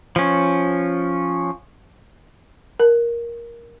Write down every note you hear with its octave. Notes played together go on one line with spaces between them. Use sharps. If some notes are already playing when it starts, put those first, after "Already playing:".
F3 C#4
A#4